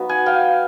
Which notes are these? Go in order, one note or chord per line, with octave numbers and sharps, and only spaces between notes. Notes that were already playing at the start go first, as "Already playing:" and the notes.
Already playing: F#3 B3 D#4
F#5 G#5
F5 G5